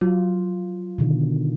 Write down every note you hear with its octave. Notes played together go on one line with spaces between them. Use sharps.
F#3 F4
B2 D3 D#3